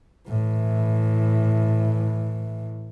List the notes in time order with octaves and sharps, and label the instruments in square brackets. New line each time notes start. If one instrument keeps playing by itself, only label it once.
[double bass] A2 E3